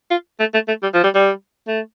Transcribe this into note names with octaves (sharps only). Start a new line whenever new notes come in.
F4
A3
A3
A3
G3
F3
G3
G3
A3